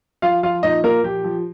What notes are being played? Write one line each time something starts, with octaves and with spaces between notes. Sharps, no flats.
F3 F4 F5
F3 F4 F5
A#2 D#4 D#5
A#2 A#3 A#4
F3 G4
F3